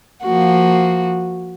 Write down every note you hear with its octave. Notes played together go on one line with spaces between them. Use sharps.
F3 A#3 F#4